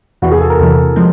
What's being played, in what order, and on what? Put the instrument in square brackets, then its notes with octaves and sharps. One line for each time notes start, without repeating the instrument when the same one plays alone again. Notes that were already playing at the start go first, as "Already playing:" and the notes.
[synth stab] E2 C3 E3 [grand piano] F#4
[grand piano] G#4
A4
A#4
[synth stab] E2 C3 E3 [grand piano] A4
[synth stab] F3 G#3 C4